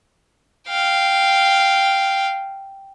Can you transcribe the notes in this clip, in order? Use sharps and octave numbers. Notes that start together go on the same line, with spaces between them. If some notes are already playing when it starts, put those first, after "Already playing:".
F5 G5